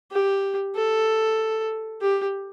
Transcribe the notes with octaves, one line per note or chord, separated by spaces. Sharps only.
G4
A4
G4